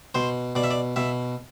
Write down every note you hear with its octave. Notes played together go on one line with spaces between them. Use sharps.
B2 C5
B2 D5
E5
D5
B2 E5